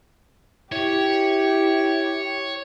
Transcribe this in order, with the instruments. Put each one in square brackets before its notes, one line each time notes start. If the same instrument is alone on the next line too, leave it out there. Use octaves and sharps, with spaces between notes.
[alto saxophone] E4 [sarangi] G4 [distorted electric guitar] C#5